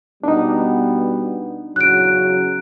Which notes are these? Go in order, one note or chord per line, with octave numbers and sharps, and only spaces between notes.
B2 G3 B3 D4 D#4
E2 C#3 F#3 F#6 D7